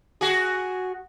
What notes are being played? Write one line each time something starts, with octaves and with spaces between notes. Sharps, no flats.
F#4 G#4